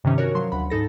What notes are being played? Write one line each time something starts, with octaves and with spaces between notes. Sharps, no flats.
G2 C3 D#3 E3 C#4
F#4 A#4 C#5
F3 F#3 C6
D2 F#5 B5
G#2 D#4 A4 A#6